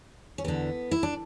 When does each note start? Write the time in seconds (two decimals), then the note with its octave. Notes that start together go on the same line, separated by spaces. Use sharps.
0.38 C#4
0.44 E2 D3 B3
0.91 E4
1.03 D4